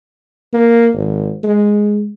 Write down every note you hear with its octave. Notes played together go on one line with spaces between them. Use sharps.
A#3
G#1
G#3